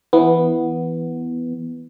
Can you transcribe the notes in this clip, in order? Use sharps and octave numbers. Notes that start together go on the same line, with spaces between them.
E3 B3